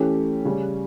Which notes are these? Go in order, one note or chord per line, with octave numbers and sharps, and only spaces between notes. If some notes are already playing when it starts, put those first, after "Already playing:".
Already playing: E3 A3 C#4 G4
C#3 G3 C#4